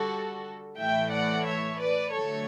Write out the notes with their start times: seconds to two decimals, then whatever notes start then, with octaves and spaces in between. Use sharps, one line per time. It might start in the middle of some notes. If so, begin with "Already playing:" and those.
Already playing: D3 G3 F#4 A4
0.78 A2 E3 A3 E5 G5
1.11 D5 F#5
1.45 C#5 E5
1.79 B4 D5
2.12 D3 F#3 A3 A4 C#5